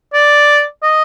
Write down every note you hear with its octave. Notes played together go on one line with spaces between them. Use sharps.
D5
D#5